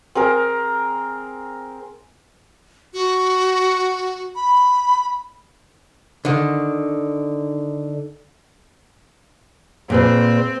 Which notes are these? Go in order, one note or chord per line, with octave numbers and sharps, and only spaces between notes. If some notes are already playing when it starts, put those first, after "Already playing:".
C4 G#4 A#4
F#4
B5
D3 D#3
A#2 C4 G#4 B4